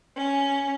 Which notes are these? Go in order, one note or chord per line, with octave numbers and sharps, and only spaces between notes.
C#4